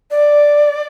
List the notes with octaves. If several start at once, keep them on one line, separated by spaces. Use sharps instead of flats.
D5